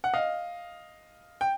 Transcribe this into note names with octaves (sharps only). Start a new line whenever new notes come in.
F#5
D#5 F5
G5